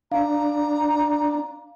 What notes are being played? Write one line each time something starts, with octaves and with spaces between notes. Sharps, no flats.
D4 F5 A#5